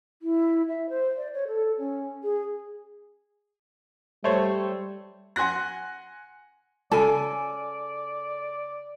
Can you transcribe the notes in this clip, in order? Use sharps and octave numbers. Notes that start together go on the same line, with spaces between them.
E4
E5
C5
D5
C#5
A4
C#4
G#4
G3 A3 C5 C#5
F#5 G#5 C6 F#6 A#6
C#3 A4 D5 G#5